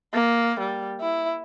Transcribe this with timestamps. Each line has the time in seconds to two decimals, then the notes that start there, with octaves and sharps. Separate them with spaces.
0.14 A#3
0.60 G3
1.01 E4